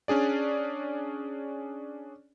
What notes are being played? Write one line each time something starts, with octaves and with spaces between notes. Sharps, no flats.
C#4 D4 G#4 D5